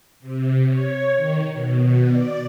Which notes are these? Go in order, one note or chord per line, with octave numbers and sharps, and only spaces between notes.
C3
C#5
D#3
B2
D5